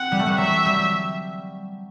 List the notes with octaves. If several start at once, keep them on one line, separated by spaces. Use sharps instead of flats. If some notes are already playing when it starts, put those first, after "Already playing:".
Already playing: C4 F#5
G3
A3
G3
F#3 E5
G3